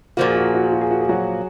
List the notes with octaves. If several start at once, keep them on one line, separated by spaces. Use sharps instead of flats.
A#2 F3 A#3 F#4
G#4
F#4
G#4
F#4
G#4
F#4
G#4
F#4
G#4
F#3 F#4